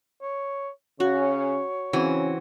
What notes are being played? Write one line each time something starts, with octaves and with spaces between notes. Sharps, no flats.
C#5
C#3 C#4 F#4 C#5
C#3 E3 C4 C#4 F#4